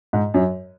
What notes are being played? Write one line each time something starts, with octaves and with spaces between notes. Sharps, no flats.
G#2
F#2